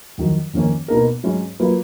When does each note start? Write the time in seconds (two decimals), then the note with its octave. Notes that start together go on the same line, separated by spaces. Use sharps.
0.18 F2 D#3 F#3
0.54 F2 D#3 A#3 C#4
0.88 B2 A#3 D#4 A#4
1.23 G#2 F#3 C#4
1.60 F#3 A#3 F4 B4